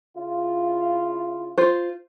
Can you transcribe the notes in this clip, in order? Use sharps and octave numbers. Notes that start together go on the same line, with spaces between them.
C#3 E4 F4
F4 C5